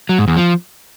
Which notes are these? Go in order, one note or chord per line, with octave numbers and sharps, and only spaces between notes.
F#3
G#2
E2
F3